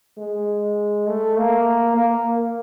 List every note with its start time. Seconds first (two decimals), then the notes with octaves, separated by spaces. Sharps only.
0.18 G#3
1.07 A3
1.38 A#3
1.96 A#3